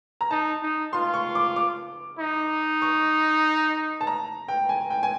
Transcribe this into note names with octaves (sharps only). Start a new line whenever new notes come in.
A#5
D#4 A5
D#4
F4 C6
C#6
D6
D6
D#4
C#6
A5
A#5
G5
G#5
G5
G#5